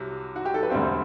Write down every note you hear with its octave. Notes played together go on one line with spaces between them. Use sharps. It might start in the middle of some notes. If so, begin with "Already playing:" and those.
Already playing: C2 C3 F#3
F#4
G4
A4
B4
E1 D2 D3 G3 C4 C5